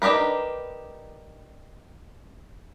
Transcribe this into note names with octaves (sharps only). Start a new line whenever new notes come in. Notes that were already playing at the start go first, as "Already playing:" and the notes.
D4 D#4 G4 A#4 B4